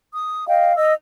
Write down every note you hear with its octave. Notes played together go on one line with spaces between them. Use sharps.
D#6
D#5 F5 G5
D#5 E6